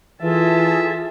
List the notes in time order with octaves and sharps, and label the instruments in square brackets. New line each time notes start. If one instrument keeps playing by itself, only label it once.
[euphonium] E3 [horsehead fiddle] F4 A5 [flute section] G#4 A4 [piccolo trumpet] E5